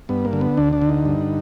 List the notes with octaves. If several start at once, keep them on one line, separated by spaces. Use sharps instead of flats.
G2 B3
A#3
D3
B3
D2 D4
D4
D3
D#4
G2